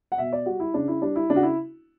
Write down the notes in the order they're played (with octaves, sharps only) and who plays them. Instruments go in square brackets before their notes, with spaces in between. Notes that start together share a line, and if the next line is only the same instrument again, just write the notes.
[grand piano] F#5
B2 E5
D5
G3 F#4
E4
C#3 D4
E4
G3 D4
E4
C#3 D4
F#4
E4